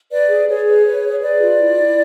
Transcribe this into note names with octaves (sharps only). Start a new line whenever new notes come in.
B4 D5
G#4
G#4 C#5
B4
B4
G#4
B4 D5
F4
E4
E4